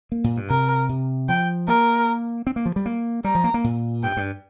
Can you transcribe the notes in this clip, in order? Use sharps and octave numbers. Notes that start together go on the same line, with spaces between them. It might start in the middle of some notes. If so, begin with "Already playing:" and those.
A#3
A#2
G2
C3 A#4
C3
F3 G5
A#3 A#4
C4
A#3
F3
G3
A#3
G3 A#5
F3
A#3
A#3
A#2
G2 G5
G2